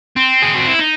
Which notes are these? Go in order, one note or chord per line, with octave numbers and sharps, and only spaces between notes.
C4
G#4
F#4
E4
D#4